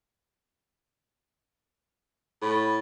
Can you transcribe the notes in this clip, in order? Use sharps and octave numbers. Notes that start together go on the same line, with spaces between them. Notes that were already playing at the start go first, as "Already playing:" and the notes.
A2 B5